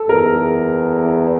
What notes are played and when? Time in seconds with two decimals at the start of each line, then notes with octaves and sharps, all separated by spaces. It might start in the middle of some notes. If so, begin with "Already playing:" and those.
Already playing: A4
0.09 E2 A#4